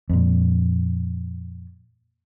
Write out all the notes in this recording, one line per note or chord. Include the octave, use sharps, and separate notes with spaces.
F2 A#2